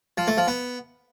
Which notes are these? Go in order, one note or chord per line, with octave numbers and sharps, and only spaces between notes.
F3
A3
F3
B3